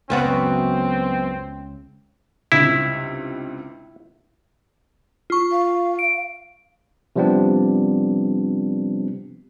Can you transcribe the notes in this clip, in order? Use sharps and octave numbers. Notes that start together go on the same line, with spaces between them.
C#2 F#2 C#3 B3 C4 F#4
C#2 G2 C3 E4
F4 C#6
F5
D7
C3 F3 G3 B3 C4 D4